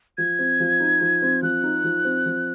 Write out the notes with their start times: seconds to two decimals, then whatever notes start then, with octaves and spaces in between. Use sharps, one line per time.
0.18 F3 G#6
0.39 C4
0.60 F3
0.80 D#4
1.01 F3
1.22 C4
1.43 F3 F#6
1.64 D#4
1.84 F3
2.05 C4
2.26 F3